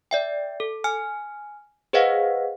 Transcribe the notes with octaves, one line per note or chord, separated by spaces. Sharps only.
D5 E5 G5
A4
G#5 F6
G#4 B4 C5 D#5 F5 F#5